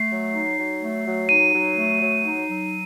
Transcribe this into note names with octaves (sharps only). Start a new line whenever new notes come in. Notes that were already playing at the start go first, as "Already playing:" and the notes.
Already playing: A3 C7
F#3
D#4
F#3
A3
F#3
D#4 D#7
F#3
A3
F#3
D#4
F#3